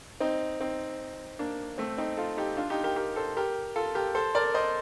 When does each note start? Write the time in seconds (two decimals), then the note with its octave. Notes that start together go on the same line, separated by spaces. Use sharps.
0.20 C4 D#4
0.60 C4 D#4
1.39 A#3 D4
1.78 A3 C4
1.98 C4 D#4
2.17 F4 A4
2.37 D#4 G4
2.57 D4 F4
2.70 D#4 G4
2.83 G4 A#4
2.96 G4 A#4
3.16 A4 C5
3.37 G4 A#4
3.76 F4 A4
3.95 G4 A#4
4.15 A4 C5
4.35 A#4 D5
4.54 C5 D#5